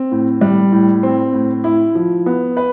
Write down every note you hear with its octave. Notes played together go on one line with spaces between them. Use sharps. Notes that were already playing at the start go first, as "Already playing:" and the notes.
Already playing: C4
A2
G3
A2
C4
A2
E4
F3
B3
B4